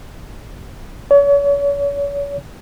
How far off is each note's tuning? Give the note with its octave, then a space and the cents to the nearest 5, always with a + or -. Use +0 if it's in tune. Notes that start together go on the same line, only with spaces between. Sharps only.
C#5 +40